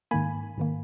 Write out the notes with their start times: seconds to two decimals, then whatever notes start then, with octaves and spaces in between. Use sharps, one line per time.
0.11 G#2 D#3 A#3 G#5 B5
0.58 G#2 D#3 A#3